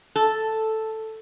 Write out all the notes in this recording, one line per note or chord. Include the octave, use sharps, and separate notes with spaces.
A4